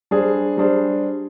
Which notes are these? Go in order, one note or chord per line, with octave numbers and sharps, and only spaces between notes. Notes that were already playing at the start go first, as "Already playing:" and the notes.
G3 D4 G#4 C5
G3 D4 G#4 C5